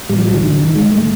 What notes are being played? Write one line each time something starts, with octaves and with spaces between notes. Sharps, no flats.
A2 G3
F3
F#3
D#3
D3
D#3
G#3
A3